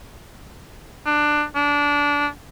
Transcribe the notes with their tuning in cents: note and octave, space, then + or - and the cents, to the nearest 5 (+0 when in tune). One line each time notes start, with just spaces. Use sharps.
D4 +15
D4 -20